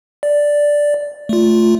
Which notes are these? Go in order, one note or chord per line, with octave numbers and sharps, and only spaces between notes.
D5
A3 F4